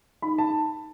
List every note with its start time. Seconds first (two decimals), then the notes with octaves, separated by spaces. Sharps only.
0.22 D#4 B5
0.38 A5